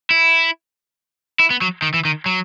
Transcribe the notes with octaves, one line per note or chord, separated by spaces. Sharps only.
E4
E4
B3
F#3
D#3
E3
D#3
F#3